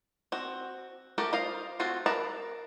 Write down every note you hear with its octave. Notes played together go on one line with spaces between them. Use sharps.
C4 F#4
A3 F#4 G4 A4 A#4
F4 C5 D#5 F5
A3 C4 F4 F#4
A#4 B4 E5 A5 A#5